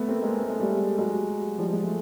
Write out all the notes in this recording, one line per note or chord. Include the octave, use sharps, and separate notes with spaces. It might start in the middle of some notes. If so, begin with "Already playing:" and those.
Already playing: A3 B3
A#3 C4
G#3 A#3
A3
G#3
G3 A3
F#3 G#3
F3 G3
G#3
A3